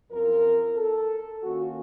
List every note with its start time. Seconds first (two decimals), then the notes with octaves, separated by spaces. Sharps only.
0.11 F#2 F3 C4 F4 A#4
0.76 A4
1.42 D#3 A#3 C#4 F4 F#4